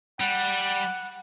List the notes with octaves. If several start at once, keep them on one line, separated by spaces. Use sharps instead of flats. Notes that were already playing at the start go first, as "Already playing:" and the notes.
G3 F#5